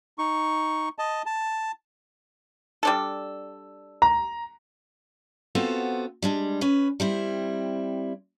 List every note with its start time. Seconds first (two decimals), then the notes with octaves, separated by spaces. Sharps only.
0.18 D#4 C#6
0.99 D#5 A5
1.26 A5
2.83 G3 D4 A4
4.02 A#5
5.55 B3 C4 F4 F#4 A4 C5
6.22 G3 G#3 D4
6.61 C#4 B4
7.00 G3 C4 E4